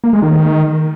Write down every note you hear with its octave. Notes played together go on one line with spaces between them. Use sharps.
A#3
G#3
D#3